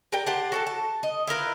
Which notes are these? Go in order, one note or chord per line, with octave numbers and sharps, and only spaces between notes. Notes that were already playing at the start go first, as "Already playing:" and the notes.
G4 A#4 D5 G5
G4 C5 F#5 A5
F#4 A4 A5
A5
D#5
E4 F4 A#4 B4